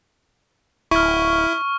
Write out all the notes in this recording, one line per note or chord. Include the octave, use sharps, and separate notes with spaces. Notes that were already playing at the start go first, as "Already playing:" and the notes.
D1 E4 C#6 F6